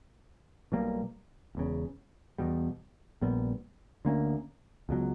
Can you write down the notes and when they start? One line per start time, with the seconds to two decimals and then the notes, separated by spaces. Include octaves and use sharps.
0.72 B1 B2 G3 A#3
1.55 E1 E2 C#3
2.38 E2 B2 G3
3.21 A#1 A#2 G3 B3
4.05 D2 D3 A#3 C#4
4.89 C#2 B2 F#3